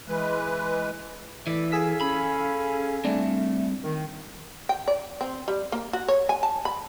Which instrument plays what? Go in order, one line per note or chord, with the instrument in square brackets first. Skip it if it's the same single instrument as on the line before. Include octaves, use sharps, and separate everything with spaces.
[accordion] E3 G#3 B4
[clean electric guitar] E3 [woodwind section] A3 D5 E5
[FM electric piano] G#4 E6 B6 [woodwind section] A4 F5 G#5
[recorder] C#4 [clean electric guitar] B5
[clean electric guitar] G3 C4 [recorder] A3 [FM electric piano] D4
[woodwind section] D#3
[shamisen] G5
D5
C4
G3
A#3
F#4
C#5
G#5
A5
B5